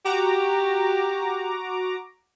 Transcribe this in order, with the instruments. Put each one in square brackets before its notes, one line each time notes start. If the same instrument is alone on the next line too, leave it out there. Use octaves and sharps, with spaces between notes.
[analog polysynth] F#4 A#5 D6 [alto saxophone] G4